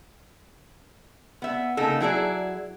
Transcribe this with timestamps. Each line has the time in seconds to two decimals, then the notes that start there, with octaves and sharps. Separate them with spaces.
1.42 B3 E5
1.77 C#3 A#3 D#4 A4
2.00 F#3 E4 G#4 D5